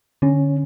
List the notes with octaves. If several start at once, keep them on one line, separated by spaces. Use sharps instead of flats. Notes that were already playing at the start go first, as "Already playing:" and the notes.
D3 C#4